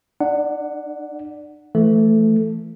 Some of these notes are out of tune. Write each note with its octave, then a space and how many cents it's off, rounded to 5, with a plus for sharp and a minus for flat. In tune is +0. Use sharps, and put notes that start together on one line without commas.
D4 +45 D5 +0 F#5 +0
E3 +30 A3 +0 A4 +0